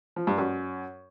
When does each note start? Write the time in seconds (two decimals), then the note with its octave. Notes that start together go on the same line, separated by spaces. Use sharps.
0.16 F3
0.27 G2
0.38 F#2